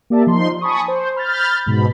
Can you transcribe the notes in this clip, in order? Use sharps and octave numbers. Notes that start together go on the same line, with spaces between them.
A#3 G4 D5 E5 A5
F3 D#4 C6
G#5 A5 B5 C#6 D#6
C5
B5 F6 G6 A6
G#2 B2 B5